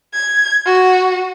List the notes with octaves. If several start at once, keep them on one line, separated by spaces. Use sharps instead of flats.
G#6
F#4